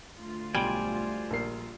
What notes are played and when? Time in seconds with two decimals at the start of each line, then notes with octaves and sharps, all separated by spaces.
0.18 D2 F4
0.55 B1 G3 C5 D5 G#5 D7
1.31 A#1 A#4 C7